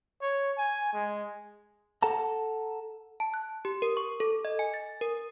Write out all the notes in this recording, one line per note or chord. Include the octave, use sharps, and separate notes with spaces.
C#5
G#5
G#3
A4 F#5 A5 A#5
A5
F#6
G4
A#4
C#6
A4
D#5
G#5
A6
A#4